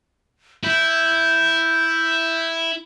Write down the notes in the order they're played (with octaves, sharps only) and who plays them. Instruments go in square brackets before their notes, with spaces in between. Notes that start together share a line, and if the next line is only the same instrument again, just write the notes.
[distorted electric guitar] E4 [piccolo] G6